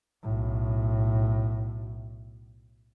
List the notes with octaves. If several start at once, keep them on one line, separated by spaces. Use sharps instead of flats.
B1 A2